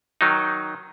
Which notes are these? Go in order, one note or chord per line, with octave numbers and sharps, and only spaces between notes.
D#3 F#3 D#4